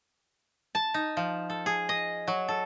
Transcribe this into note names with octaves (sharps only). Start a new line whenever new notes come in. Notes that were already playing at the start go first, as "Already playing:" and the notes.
A5
D#4
F3
A4
G#4
D#5
F#3
A4